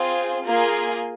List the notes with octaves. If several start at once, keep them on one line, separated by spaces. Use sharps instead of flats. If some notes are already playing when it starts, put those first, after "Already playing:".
Already playing: C4 F4 G#4
A#3 F4 G#4